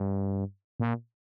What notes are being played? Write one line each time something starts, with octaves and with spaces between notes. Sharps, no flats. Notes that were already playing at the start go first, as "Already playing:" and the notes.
Already playing: G2
A#2